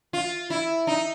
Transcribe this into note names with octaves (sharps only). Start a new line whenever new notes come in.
F4
E4
D#4